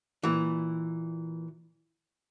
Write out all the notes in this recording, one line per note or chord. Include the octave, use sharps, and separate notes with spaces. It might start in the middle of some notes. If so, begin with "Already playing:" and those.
A#2 E3